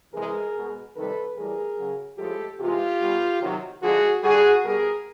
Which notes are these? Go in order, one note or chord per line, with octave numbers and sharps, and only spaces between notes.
C3 E3 G#3 G#4 A#4
B2 G#3
C3 D#3 G3 A4 B4
A2 E3 G3 G#4 A#4
C#3 F#3
A2 F3 G#3 G4 A4
C3 E3 G#3 F4 G4
B2 G3
C3 D#3 F#3
D3 F3 G#3 F#4 G#4
D3 G3 F#4 G#4
B2 G3 G#4 A#4